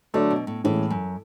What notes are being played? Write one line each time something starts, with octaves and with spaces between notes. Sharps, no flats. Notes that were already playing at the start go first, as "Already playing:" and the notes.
D3 F#3 A3 D4
B2
A2
A2 E3 G#3 C#4
F#2